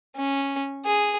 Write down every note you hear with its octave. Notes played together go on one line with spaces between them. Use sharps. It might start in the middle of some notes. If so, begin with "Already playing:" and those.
C#4
G#4